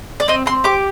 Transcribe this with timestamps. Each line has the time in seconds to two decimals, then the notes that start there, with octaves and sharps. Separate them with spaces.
0.20 D5
0.28 C4 D#5
0.46 C4 C6
0.64 G4 D6